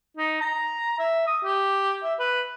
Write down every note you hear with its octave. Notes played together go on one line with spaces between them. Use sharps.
D#4
A#5
E5
D#6
G4
E5
B4